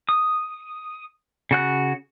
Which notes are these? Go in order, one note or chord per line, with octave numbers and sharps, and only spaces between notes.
D#6
C#3 F#4 F#6